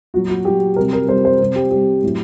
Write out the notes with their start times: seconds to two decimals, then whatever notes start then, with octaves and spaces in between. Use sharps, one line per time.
0.14 A#2 F#3 F#4
0.29 F#4
0.45 A#2 F#3 G4
0.76 C3 G3 A#4
0.93 A#4
1.08 C3 G3 C5
1.25 C5
1.40 C3 G3
1.56 G4
1.71 C3 G3 G4
2.03 A2 F#3